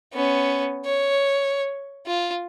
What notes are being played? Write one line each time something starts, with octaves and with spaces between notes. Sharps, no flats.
B3 C#4
C#5
F4